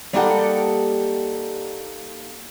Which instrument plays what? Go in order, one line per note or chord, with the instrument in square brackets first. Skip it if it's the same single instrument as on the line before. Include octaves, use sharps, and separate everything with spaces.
[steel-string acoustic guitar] G3 A#3 D#4 G4 A4 F#5